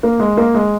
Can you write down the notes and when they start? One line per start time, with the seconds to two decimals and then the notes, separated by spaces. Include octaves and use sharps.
0.03 A#3
0.20 G#3
0.37 A#3
0.54 G#3